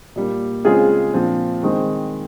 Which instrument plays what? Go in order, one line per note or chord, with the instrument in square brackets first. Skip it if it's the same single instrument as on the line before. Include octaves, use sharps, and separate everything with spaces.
[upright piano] A#2 G3 A#3
C#3 G#3 C4 F4 G#4
A#2 F3 C4
D#3 G#3 C4